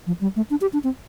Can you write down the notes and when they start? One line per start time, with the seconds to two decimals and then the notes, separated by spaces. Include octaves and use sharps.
0.07 F3
0.21 G3
0.36 A3
0.50 D4
0.61 G4
0.73 D4
0.84 C4